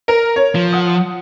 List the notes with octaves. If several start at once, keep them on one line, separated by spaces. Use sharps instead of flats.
A#4
C#5
F3
F#5 D#6